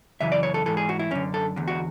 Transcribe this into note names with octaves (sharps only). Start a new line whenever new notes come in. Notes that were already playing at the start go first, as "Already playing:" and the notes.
F#2 C#3 E3 E5
D5
C#5
A4
G#2 E3 A4
G#4
F#4
E4
F#2 D3 C#4
A4
E2 D3
F#4